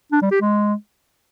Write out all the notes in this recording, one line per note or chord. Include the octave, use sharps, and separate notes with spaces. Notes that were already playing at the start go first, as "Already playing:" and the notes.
D4
G3
G4
G#3